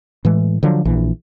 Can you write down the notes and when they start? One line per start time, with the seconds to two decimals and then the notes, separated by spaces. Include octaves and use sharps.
0.25 A2 E3 G#3
0.63 D3 F3 F#3
0.85 A#1 E3